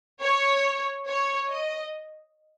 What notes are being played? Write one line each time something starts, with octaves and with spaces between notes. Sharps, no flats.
C#5
C#5
D#5